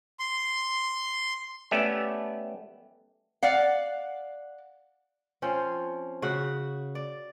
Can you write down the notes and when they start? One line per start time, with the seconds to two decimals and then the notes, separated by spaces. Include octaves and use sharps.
0.20 C6
1.71 A3 B3 C#4 G4 D5 E5
3.43 D5 F5 F#5
5.42 F3 C4 C#4
6.22 C#3 F#4
6.95 D5